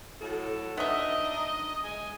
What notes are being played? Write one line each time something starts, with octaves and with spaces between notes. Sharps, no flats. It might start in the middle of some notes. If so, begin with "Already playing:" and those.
A2 F#3 A4
B3 D4 D#4 D#5 E5
G#3 G#5